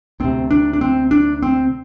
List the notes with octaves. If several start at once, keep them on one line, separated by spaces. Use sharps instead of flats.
D2 C3 C4
D4
D4
C4
D4
C4